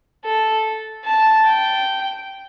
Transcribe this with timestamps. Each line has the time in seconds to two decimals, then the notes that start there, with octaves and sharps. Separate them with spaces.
0.25 A4
1.05 A5
1.46 G5